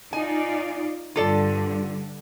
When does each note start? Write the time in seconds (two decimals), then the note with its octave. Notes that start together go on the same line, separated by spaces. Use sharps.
0.13 D#4 F4 D5 G#5
1.16 G2 D3 F4 A4 D5